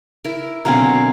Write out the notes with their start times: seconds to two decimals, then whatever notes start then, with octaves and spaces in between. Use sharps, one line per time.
0.24 E4 A#4
0.65 B2 D3 F#3 C4 C#4 A#4 F5 G#5